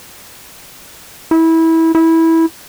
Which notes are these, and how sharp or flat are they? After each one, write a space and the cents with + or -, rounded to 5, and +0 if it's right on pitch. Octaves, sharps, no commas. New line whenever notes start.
E4 -20
E4 -15